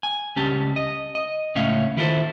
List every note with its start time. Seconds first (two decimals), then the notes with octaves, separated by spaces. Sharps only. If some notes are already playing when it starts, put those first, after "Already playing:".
0.03 G#5
0.36 C#2 G3 C#4 G4 A5
0.76 D#5
1.15 D#5
1.55 C#2 A2 C#4 C#5 E5 F5
1.97 D#3 E4 F4 G4 A4 C5